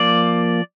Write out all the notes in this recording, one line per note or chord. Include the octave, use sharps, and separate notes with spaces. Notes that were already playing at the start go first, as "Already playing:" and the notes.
Already playing: F3 A#3 D5